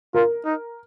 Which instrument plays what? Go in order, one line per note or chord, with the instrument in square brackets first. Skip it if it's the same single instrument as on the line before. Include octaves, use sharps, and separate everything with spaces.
[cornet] F4 [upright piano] A#4
[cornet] D#4